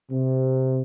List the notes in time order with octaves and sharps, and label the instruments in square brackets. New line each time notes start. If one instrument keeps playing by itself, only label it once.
[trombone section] C3